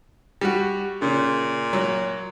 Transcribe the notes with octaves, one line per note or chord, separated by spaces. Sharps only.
G3 F#4
A#2 C#3
F#3